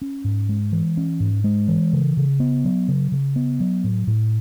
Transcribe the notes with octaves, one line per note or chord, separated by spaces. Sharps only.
C#4
G#2
G#3
E3
C#4
G#2
G#3
E3
C#3
C#3
B3
F#3
C#3
C#3
B3
F#3
A2
A2